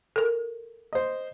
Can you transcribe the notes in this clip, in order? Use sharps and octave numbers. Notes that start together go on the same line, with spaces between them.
A4 A#4
C5 D#5